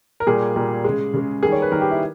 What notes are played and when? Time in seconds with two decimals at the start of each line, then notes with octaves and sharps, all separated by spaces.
0.20 A#4
0.27 A#2 G3 A#3 G#4
0.56 A#2 G3 A#3
0.84 C#3 G#3
1.14 C#3 G#3
1.42 D#3 G3 A#3 G#4
1.52 C#5
1.62 B4
1.72 D#3 G3 A#3 A#4
1.81 G4
1.91 E4